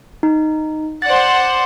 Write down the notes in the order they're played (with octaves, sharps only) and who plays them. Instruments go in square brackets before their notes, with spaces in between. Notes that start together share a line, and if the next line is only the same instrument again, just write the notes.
[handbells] D#4
[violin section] C5 D5 F#5 [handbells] A6